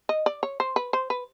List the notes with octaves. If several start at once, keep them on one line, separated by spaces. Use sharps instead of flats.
D#5
D5
C#5
C5
B4
C5
B4